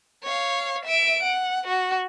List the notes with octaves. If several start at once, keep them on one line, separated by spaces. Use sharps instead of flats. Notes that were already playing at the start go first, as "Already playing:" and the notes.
C#5 F5
E5 D7
F#5
F#4